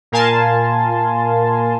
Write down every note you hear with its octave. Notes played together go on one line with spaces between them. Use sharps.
A#2 A#4 F5 G#5 A5 C6